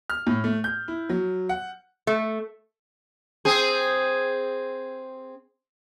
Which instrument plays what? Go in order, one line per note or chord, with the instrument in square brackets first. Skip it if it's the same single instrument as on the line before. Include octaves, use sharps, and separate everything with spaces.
[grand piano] F6
A2
A3
G6
E4
F#3
F#5
[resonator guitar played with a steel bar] A3
[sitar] C4 G#4